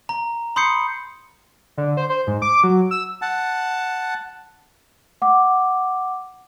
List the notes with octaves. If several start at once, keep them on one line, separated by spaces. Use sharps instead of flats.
A#5
B5 C6 D#6 G6 C7 C#7
D3
C5
C5
G#2
D6
F#3
E6
F#5 A5
F#5 D6